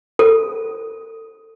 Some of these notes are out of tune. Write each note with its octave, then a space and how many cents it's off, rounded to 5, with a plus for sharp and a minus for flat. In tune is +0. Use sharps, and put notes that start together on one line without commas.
A4 +30